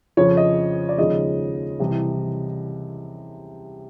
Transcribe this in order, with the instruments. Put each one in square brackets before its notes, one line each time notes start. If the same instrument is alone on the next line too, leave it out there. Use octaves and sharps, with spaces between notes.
[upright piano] F2 C#3 F3 C#5
D#5
D5
D#2 C#3 F3 G#3 D#5
C2 C3 E3